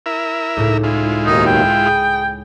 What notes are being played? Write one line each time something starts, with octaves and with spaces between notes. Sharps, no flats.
E4 A#4 E5
C#2 A2 D#4
G#3 C#4 E4 F4
D#2 B2 D#3 D#4 D#5
G5 B5
G#4 G#5 B5 D#6